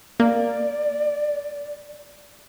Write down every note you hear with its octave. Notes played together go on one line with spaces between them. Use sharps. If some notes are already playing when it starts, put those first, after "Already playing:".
A#3 D5